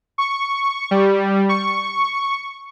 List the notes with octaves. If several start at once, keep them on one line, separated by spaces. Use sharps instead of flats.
C#6
G3
C#6